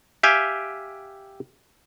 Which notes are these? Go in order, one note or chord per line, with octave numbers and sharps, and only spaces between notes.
G4 E5 F5 G5 G#5